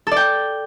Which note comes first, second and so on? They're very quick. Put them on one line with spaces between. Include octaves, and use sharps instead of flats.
A4 D5 G5